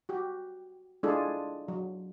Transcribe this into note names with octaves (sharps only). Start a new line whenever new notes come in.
F#4 G4
G#3 D4 E4 F4 G#4 A4
F#3